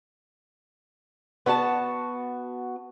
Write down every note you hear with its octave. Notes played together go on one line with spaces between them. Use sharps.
B3 F#4 G4 A5